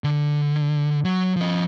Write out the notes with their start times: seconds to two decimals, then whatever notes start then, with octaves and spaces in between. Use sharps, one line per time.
0.04 D3
1.05 F#3
1.36 F3 D#5